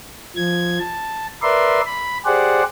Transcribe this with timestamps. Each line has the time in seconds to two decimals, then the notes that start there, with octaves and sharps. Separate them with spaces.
0.36 F3 G#6
0.79 A5
1.42 A#4 B4 D5 E5 C6
1.86 B5
2.25 G4 G#4 C5 D5 F#5